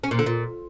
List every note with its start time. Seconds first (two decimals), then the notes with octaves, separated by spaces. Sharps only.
0.04 C#4
0.11 A#2
0.19 D3
0.26 A#2